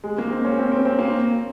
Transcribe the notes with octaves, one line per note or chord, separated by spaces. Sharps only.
G#3
A#3
C4
C#4
C4
C4
C4
A#3